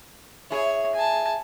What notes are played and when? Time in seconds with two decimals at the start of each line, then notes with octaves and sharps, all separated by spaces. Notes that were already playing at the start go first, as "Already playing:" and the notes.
0.50 E4 G#4 C#5
0.95 G#5 A5